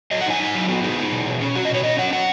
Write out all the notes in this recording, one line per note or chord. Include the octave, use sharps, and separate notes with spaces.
F#3 D#5
F#5
D#4 G#5
D#4
F#3
B3 F#4
D#4 G#4
D#4
B2
B2
C#4
F#3 F#4
D#5
B2 C#5
C#4 D#5
F#3 F#5
F#3 F#5